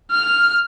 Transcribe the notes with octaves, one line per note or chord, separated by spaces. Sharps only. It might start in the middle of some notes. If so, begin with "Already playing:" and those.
F6